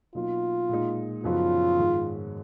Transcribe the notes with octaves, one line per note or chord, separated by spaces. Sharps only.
B2 F#3 A#3 D#4 F4
A#2 G#3 D#4
F#2 C#3 F3 B3 D#4 F4
G#2 D#3 G#3 D#4